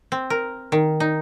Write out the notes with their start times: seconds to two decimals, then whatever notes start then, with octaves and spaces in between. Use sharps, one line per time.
0.12 C4
0.30 A#4
0.72 D#3
1.00 D#4